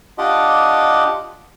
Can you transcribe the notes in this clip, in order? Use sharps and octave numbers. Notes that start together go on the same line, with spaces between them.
D4 F4 G4 D#5 F#5